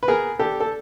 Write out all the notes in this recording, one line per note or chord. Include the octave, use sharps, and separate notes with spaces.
B4
B3 G#4 A#4
D4 G4 A4
A4